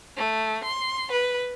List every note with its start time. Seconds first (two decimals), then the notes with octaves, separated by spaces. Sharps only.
0.17 A3
0.64 C6
1.11 B4